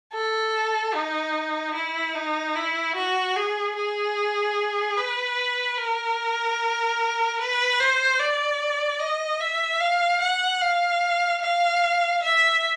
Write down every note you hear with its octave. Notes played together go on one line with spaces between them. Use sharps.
A4
D#4
E4
D#4
E4
F#4
G#4
G#4
B4
A#4
B4
C5
D5
D#5
E5
F5
F#5
F5
F5
E5